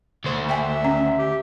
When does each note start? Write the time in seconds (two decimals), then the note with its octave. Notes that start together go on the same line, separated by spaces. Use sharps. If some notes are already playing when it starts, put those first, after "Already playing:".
0.25 D2 C5
0.49 E5 G5 G#5
0.85 C#4
1.18 G4